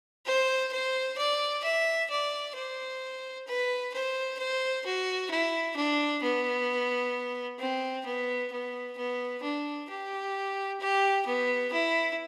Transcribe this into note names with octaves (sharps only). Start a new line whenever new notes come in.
C5
C5
D5
E5
D5
C5
B4
C5
C5
F#4
E4
D4
B3
C4
B3
B3
B3
D4
G4
G4
B3
E4